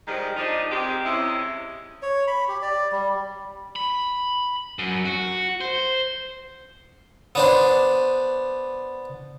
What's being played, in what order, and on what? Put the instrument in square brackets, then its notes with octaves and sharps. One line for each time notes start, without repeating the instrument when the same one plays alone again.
[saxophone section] D#3 F3 G3 G#3
F3 D4 D#4
D#3 G#3 C4 G4
C3 G#3 C#4 E4
[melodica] C#5
B5
G4
D5
G3
[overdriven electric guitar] B5
F#2
F#4
C5
[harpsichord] B3 D4 C5